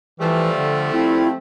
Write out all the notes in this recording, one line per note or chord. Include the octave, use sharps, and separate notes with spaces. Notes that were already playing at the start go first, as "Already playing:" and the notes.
E3 F3 G3 A3
D3
C4 E4